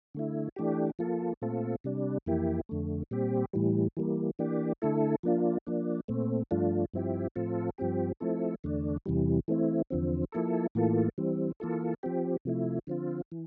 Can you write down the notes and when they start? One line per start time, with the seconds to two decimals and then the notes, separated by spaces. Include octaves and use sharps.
0.15 D3 A3 E4
0.56 E3 A3 D4 G4
0.99 F3 A#3 F4 A4
1.42 A#2 A3 C4 F4 A4
1.84 C3 G3 D4
2.26 F2 E3 A#3 E4 G4
2.69 F2 D3 A3
3.11 A#2 G3 C4 G4
3.53 A2 E3 G3
3.97 E3 G3 A#3
4.39 E3 A#3 D4 G4
4.82 D3 A3 E4 A4
5.23 F3 A#3 D4 F4
5.67 F3 A#3 D4
6.08 A#2 A3 C4
6.51 G2 F3 A3 D4 F4
6.94 G2 F3 C4 E4 G4
7.36 A2 F3 C4 F4 A4
7.78 G2 F3 C4 G4
8.20 F3 A3 C4 E4 A4
8.64 E2 D3 A3 D4
9.06 E2 C3 E3 G3
9.48 E3 A3 C4 E4
9.90 E2 D3 F3 C4
10.32 F3 A#3 E4 A4
10.75 A2 E3 A#3 F4 A4
11.18 E3 G3 C4
11.60 E3 A#3 F4 A4
12.03 F3 C4 G4
12.45 C3 F3 A3 E4
12.87 D3 F3 C4 F4
13.32 E3